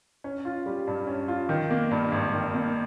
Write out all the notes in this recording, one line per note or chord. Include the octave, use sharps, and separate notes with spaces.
C#4
F4
G3
G2
C#4
F4
D#3
A#3
G2
G#1
D#3
A#3